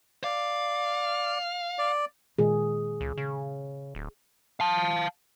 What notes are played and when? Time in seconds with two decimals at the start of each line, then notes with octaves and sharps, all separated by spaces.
0.24 D5 F5
1.78 D5
2.39 A#2 D#3 G#3 G#4
3.01 C#2
3.17 C#3
3.95 D1
4.60 F5 A5